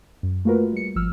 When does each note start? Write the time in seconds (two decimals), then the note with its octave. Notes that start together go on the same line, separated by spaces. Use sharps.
0.23 F#2
0.45 A3 A#3 F4 F#4 A#4 B4
0.73 G3 C#7
0.95 G#1 F3 E6 F6